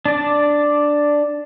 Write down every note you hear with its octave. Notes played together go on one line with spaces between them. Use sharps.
D4 D5